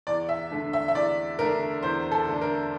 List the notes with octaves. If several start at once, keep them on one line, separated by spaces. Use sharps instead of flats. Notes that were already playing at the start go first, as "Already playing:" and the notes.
E2 D5
E5
D3 A3 D4
E5
E5
E2 D5
D3 A3 D4 A#4
E2 C5
A4
D3 A3 D4
A#4